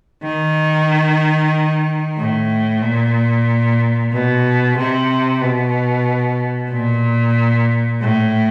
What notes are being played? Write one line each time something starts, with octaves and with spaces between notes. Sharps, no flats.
D#3
A2
A#2
B2
C3
B2
A#2
A2